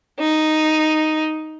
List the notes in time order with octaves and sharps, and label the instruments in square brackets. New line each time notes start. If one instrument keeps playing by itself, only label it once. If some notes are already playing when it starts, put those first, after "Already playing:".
[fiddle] D#4